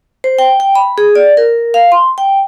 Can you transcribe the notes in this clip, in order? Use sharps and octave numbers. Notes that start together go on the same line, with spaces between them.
C5
G5
G5
B5
G#4
D5
A#4
F5
C6
G5